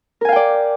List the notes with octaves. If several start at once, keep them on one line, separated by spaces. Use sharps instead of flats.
A#4 D5 F5 G5 G#5